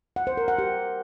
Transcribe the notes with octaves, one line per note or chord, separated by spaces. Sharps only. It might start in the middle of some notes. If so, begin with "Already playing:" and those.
F#5
C5
A#4
F#5
G4